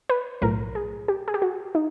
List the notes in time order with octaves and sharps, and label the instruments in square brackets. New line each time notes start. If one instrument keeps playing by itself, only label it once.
[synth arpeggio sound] B4
B1 A2 F3 A#4
G#4
G4
G#4
G4
F#4
D#4